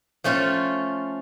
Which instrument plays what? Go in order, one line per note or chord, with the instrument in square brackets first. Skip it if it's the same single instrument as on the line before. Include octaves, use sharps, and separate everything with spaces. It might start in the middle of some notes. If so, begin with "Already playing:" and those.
[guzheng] F3 A3 C#4 F4 C#5